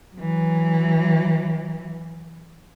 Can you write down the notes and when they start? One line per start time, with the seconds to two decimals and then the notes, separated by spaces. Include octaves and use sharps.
0.15 E3 F#3